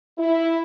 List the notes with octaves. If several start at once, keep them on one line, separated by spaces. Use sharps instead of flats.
E4